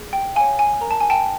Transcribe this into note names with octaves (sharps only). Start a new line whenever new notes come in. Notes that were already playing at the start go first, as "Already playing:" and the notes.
Already playing: G#4
G5
C#5 F5 G#5
G#5
A#4 A#5
A5
G#5
G5 A5